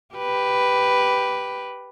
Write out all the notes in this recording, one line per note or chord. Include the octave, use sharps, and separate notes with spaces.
G4 B4